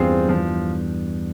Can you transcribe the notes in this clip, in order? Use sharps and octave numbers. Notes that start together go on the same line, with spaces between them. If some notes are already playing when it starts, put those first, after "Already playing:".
Already playing: E2 G2 C4 F4 G#4 C5
F3